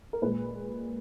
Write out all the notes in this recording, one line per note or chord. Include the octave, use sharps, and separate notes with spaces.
A#4
A#2 G#3 B4